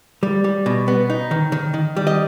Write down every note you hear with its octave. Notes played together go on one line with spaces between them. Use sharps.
G3
G3
B2
B3
D#4
D#3
D#3
D#3
G3
D#5